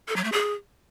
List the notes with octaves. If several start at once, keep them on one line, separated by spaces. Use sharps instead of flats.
A4
F#3
A3
G#4